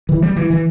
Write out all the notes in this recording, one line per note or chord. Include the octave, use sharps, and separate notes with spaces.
E3
G3
E3
E3